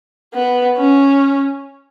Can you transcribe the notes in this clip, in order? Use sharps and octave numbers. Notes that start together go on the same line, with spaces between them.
B3
C#4